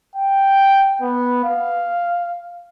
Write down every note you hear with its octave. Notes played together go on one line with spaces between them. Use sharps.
G5
B3
F5